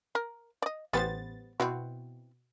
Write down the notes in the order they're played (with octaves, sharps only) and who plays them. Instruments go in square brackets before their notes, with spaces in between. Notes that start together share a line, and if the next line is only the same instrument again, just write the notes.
[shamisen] A#4
D5 D#5
[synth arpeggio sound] A1 B3 A6 [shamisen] G3 B4 C5
[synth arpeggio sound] B2 [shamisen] C4 E4 F#4